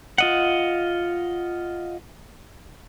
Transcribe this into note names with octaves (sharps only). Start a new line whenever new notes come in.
F4 D#5 F#5